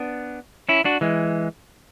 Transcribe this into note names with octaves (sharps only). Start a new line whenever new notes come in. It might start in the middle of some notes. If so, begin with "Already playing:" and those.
Already playing: B3 D4
C#4 E4
D4 F#4
E3 G#3